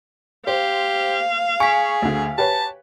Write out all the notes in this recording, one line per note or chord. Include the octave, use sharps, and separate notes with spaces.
G4 C5 F5
G#4 G#5 C#6 B6
D2 D3
G4 B4 C#5 A5